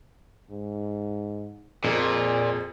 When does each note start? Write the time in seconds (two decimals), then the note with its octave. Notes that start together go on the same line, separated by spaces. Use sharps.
0.51 G#2
1.84 F2 A#2 G#4